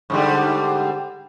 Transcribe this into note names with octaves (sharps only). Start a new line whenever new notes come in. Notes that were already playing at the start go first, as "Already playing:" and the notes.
G#2 D3 G3